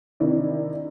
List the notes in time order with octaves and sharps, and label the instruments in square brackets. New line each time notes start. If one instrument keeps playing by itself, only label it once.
[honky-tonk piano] C3 D#3 D4 E4